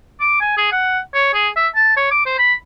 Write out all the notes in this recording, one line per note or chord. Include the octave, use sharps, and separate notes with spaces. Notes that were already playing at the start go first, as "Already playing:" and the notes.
D6
G#5
G#4
F#5
C#5
G#4
E5
A5
C#5
D6
C5
B5